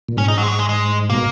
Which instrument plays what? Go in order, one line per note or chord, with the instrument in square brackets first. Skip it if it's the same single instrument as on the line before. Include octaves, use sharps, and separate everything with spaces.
[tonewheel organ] A#2
[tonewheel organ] G#2 [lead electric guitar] C#4
[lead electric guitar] D#4
F#3
G#3
F#3
G#3
G#3
[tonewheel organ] B2 [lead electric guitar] A#3